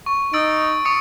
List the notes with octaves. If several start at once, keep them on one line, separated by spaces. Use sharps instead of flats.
C#6
D#4 E6 A6 D7
C#6 D#6 C#7